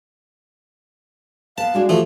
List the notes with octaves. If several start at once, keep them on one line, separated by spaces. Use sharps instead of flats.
B3 B4 F5 A5
G#3 D4 E4 F#4
E3 F3 A3 G4